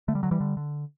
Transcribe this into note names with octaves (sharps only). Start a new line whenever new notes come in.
D3 A3
G3
D3 F#3
E3 G3
D3
D3